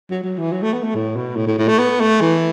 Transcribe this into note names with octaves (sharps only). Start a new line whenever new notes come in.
F#3
F#3
E3
F#3
A3
B3
A3
A2
B2
A2
A2
A2
A3
B3
A3
E3